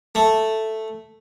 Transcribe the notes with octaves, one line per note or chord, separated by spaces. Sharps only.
A3